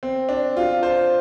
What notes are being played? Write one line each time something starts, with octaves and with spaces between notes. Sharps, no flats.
C4
D4
F4
C5